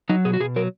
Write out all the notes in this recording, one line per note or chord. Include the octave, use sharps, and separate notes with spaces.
F#3 D#4
B2 G#4
F#4
B2 G#4
F#3 A#4